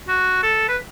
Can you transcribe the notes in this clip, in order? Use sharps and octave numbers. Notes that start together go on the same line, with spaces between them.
F#4
A4
B4